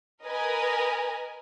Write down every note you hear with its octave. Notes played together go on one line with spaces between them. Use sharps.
A#4 B4 D#5 G#5